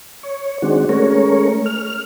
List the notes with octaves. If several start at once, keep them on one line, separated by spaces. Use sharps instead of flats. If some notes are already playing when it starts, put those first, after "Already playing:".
C#5
D#3 G#3 C4 D4 F#4
G#3 A3 C#4 A#4 C#5
F6